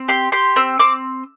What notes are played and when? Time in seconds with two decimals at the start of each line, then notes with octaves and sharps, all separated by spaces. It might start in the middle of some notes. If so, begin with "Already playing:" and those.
Already playing: C4
0.08 G4 C6
0.32 G4 C6
0.56 C4 E6
0.79 C4 D6